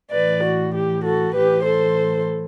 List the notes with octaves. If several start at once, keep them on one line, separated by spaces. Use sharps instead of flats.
A2 E3 B4 D5
F#4
G4
F#4 A4
A2 E3 G4 B4
A4 C5